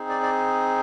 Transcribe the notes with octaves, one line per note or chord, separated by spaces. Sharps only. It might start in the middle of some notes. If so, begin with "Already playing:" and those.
Already playing: C4 D#4 G#4
D5
D5